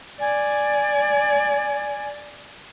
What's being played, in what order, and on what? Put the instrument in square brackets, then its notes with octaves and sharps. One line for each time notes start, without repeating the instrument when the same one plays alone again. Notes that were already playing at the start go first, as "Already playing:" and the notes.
[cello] D5 [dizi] G#5